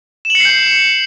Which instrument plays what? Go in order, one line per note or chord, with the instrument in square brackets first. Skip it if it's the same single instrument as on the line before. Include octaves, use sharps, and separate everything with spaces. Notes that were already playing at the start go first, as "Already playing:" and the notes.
[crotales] E7
F#7
C#7
C7
G6